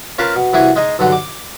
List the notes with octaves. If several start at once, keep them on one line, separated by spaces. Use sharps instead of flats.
C#4 F4 A#4 B4 A5 C6
B2
C2 E3 E4 F#4 G#4 G#5
G#3 D#4 G#4 D#5
B1 G2 D3 F#4
D6